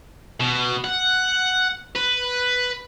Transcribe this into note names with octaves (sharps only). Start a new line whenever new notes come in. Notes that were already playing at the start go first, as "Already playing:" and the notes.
B2
F#5
B4